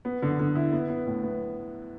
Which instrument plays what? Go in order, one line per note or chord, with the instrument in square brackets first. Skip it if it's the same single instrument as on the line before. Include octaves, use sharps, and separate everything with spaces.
[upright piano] B3
D3
D3
E4
B3
B3
A2
B3